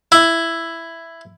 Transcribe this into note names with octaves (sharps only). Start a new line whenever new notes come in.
E4